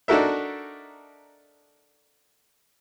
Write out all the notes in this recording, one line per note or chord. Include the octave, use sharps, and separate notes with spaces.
D4 D#4 F#4 A4 A#4 E5